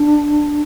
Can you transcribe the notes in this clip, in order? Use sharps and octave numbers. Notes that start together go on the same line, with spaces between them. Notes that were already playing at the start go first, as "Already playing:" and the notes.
Already playing: D4